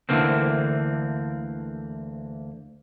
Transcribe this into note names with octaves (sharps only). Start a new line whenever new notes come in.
D2 D3 E3 A#3 C4